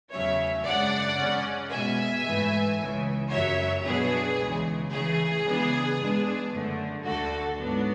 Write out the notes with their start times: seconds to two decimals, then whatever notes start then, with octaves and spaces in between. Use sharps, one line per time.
0.11 E2 C#3 F#3 A3 C#4 C#5 E5
0.65 F#2 C#3 G#3 D4 D5 F#5
1.18 C#3 G#3 C#4
1.71 B2 G#3 C#4 E5 G#5
2.25 G#2 E3 A3
2.78 C#2 C#3 E3
3.31 F#2 C#3 F#3 C#5 E5
3.84 B2 F#3 B3 D4 G#4
4.38 C#2 C#3 E3 G#3
4.91 C#3 E3 A3 C#4 G#4
5.44 C#3 E3 G#3 B3 D4
5.97 G#2 G#3 B3 D4
6.51 F#2 D3 A3
7.04 D2 D3 A3 F#4 A4
7.58 G#2 F#3 B3 D4